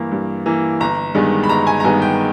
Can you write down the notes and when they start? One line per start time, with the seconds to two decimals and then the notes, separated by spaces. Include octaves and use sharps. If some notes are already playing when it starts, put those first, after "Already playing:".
Already playing: G2 E3 A#3
0.11 G2
0.46 E3 A#3
0.80 G1 A#5
1.14 G2 D#3 G#3 B3
1.44 B5
1.49 G1 A#5
1.67 G#5
1.80 A#5
1.84 G2 D#3 G#3 B3 G#5
2.02 G5